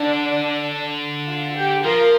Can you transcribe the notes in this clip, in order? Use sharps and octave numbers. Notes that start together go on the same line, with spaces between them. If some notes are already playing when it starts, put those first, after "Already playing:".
Already playing: D3 D4
F4
G4
F3 F4 A#4